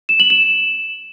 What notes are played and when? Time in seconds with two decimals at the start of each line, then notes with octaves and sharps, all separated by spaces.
0.09 E7
0.20 F#7
0.30 E7